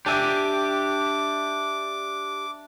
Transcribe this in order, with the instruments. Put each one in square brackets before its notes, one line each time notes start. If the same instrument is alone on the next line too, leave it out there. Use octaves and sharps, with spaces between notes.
[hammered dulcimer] D4 E5 G5 [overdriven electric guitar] G4 G#5 [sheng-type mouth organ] D6